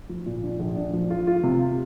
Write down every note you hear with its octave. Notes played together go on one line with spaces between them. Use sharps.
F3
A#2
D4
A#1
D4
F3
F4
F4
C3